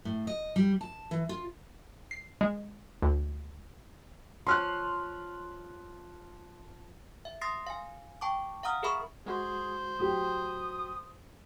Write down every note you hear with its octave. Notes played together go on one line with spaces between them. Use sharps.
A2
D#5
G3
A5
E3
F4
C7
G#3
D2
F3 C#5 C6 F6 F#6
E5
C6 D#6 A6 A#6 C7
F5 G#5
G5 A5 C#6 D6
F5 F#5 A#5 D#6 F6
G#4 A#4 E5 B5 C#6
G#3 F#4 G#4 C5
A2 F#3 G4 D#6